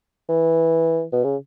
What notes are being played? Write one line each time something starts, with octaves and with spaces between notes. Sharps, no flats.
E3
B2
C#3